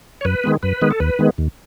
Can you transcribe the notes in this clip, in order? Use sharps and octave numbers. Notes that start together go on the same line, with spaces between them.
C#5
F#2 B4
D#3 G#3 B3
F#2 B4
D#3 G#3 B3
A4
D#2 B4
D#3 G#3 B3
D#2